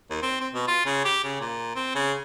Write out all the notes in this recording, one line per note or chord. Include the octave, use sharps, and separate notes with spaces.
D#2
C4
C4
B2
F4
C#3
G4
C#3
A#2
C4
C#3